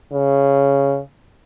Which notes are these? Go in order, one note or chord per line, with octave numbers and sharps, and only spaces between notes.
C#3